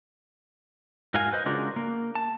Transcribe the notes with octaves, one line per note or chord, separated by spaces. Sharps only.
G#2 F#4 A#4 F5 G#5
B4 C5 D#5
C#3 G#3 D4 F4 F#4 A#4
A#3
A5